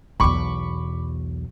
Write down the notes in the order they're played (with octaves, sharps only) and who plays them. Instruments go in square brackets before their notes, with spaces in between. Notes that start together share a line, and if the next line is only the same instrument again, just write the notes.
[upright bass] B1 E2 [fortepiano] B5 C#6 D6